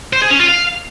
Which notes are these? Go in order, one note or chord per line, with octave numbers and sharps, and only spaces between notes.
C5
G#4
C#4
F4
F5